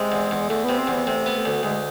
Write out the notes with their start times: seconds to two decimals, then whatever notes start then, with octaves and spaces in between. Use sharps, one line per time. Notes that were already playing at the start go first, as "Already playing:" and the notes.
Already playing: C3 G#3
0.12 E2
0.31 E2
0.49 E2 A3
0.64 C3 B3
0.78 C4
0.87 E2
0.93 B3
1.07 C3 A3
1.26 B3
1.36 A3
1.45 D2
1.63 D2 G#3